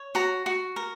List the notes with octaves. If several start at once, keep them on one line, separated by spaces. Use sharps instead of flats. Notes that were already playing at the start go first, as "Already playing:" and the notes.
Already playing: C#5
F#4 A#5
F#4
A#4